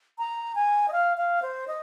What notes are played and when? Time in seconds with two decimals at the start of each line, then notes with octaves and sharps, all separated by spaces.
0.18 A#5
0.55 G#5
0.88 D#5
0.92 F5
1.17 F5
1.42 C5
1.68 D#5